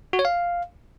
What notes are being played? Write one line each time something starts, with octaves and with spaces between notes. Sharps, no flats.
F#4
C#5
F5